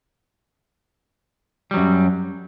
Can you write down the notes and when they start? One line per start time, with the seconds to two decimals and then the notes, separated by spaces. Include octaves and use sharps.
1.71 G3
1.74 F#3
1.77 F#2